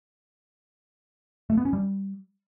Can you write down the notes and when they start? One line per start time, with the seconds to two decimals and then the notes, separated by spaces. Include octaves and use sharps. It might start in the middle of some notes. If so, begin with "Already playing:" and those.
1.50 A3
1.57 B3
1.65 C#4
1.73 G3